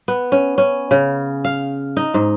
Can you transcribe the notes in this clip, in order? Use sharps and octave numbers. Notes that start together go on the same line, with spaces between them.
B3
C#4
C#4
C#3
F5
D#4
G#2